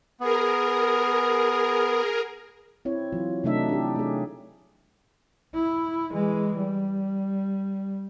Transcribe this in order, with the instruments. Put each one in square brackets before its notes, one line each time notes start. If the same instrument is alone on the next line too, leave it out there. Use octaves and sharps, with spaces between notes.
[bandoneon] B3 [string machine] G#4 A#4
[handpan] C4 E4 C#5
E3 F#3 F4
C3 F#3 A3 D4 D#4 E5
D4 G4
A3 G#4
[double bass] E4
E3 G#3
G3